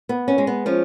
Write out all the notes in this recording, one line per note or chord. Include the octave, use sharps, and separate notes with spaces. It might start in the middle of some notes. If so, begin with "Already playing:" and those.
B3
C#4
G#3
B3
F3 C#4